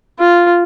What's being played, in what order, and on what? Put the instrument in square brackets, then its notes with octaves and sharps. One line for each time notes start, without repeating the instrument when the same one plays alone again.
[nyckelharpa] F4